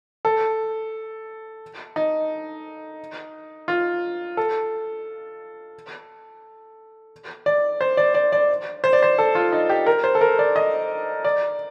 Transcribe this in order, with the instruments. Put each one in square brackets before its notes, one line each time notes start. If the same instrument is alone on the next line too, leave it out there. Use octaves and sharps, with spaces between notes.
[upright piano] A4
D#4
F4
A4
D5
C5
D5
D5
D5
C5
D5
C5
A4
F4
D#4
G4
A#4
C5
A4
A#4
D5
D#5
D5